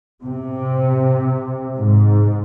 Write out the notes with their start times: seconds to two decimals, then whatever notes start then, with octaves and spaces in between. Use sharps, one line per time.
0.23 C3
1.78 G#2